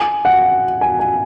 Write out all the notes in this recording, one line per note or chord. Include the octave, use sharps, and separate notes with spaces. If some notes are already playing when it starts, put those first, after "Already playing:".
Already playing: G#5
F#5
G#5
G#5